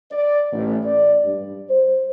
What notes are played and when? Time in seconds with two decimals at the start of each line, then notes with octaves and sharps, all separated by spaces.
0.11 D5
0.52 A1
0.84 D5
1.24 G2
1.69 C5